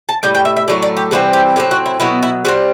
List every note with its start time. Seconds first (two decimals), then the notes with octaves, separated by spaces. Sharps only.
0.09 A5
0.23 A2 G3 G5
0.35 G5
0.45 E5
0.57 E5
0.68 A2 F#3 A3 D5
0.82 D5
0.97 G4
1.11 C3 E3 G3 C4 F#4
1.33 G4
1.56 A2 F#3 C4 G4
1.71 F#4
1.86 E4
2.00 B2 F#3 B3 E4 F#4
2.23 E4
2.45 C3 G3 C4 F#4